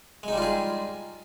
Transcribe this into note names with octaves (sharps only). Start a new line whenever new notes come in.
G3 G#3 D#4 F4 G#4